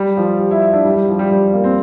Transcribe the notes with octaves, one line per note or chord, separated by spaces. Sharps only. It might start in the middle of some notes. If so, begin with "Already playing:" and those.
Already playing: G3
F3
G3
E4
E4
D4
G3
G3
F3
G3
G3
A#3
C4